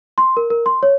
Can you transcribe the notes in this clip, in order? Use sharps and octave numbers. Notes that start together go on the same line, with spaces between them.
C6
A#4
A#4
C6
C#5